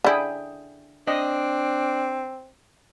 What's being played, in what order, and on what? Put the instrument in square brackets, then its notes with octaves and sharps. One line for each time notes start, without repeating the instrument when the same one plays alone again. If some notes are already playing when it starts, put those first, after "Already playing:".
[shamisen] D3 E4 [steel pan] G#4 G5 B5
[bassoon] C4 [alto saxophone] D4 [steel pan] D#5